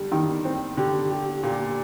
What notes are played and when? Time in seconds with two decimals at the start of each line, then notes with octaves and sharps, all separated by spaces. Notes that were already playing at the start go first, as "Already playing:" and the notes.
Already playing: D3 G3
0.12 D#3
0.45 C4
0.77 D3 G4
1.11 G4
1.43 A#2 G4